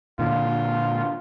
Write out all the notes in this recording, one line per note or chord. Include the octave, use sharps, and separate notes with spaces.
A#2 D3 F4